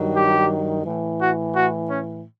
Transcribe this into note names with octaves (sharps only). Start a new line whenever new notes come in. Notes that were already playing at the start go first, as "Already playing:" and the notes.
Already playing: G2 D#3 F#3
G4
A2 E3
F#4
F#4
C#4